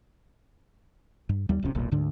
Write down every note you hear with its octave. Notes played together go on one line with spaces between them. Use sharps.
G2
D#2 G3
D1 B1 C3 C#4
E1 B1 A#2
D2 G#2 D3 D4